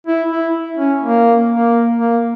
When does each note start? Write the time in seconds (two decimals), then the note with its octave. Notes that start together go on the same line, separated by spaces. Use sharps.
0.07 E4
0.31 E4
0.77 C#4
1.02 A#3
1.49 A#3
1.96 A#3